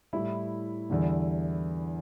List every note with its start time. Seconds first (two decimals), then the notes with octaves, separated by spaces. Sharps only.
0.13 A2 G3 E4
0.90 E2 D3 G3